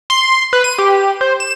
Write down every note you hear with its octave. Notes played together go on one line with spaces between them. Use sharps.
C6
B4
D#7
G4
C5
E7